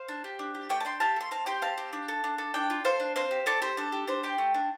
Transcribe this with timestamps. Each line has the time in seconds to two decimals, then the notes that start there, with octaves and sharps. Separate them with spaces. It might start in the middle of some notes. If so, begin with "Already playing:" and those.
Already playing: C5 F5
0.08 D4
0.24 G4
0.39 D4
0.55 G4
0.69 A3 D5 G5
0.80 A5
0.85 D4 G5 C6
1.00 G4 F5 A5
1.16 A3 C6
1.31 C4 F5 A5
1.46 G4 G5 C6
1.62 C4 F5 A5
1.78 G4
1.93 D4
2.08 A4
2.24 D4
2.38 A4
2.54 D4 D5 G5
2.70 F4
2.85 A4 C5 F5
3.00 D4
3.16 C4 C5 F5
3.31 G4
3.46 C4 A4 D5
3.62 G4 C5
3.77 D4 A4
3.92 G4
4.07 D4 C5
4.23 G4 G5 C6
4.38 A3
4.54 D4